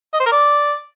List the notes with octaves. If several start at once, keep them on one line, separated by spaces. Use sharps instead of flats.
D#5
C5
A#4
D5